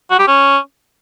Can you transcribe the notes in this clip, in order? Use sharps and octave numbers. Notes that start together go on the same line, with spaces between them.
F#4
G4
C#4